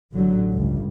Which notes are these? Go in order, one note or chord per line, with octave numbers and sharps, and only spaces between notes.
A1 A2 D3 F#3
G1 C#2